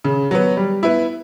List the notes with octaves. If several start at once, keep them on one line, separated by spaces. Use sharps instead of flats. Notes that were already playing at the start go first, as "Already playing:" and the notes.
C#3
F#3 B3
G3
B3 E4